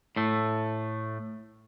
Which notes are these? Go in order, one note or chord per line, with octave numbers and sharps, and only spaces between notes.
A2 A3